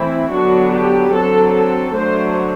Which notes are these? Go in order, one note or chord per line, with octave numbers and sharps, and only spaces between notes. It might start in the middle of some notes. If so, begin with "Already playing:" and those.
Already playing: E3 A3 C4 E4
D3 F#3 B3 D4 F#4
G4
D3 F#3 C4 A4
A4
D3 F#3 A3 D4 C5